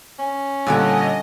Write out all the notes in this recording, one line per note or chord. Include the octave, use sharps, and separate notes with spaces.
C#4
A#2 D3 G3 A4 D#5 F#5 G#5